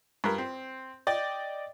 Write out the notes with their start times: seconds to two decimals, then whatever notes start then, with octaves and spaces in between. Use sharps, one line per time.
0.24 G2 A#4
0.38 C4
1.07 D5 D#5 G5 D6